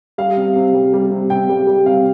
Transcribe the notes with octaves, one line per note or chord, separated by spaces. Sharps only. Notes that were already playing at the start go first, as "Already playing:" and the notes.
G3 F5
C3
C3
G3
G3
C3
C3 G5
G3
G3
C3 F5